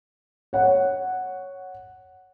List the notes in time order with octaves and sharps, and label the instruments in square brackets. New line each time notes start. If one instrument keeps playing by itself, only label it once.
[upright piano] C#5 F#5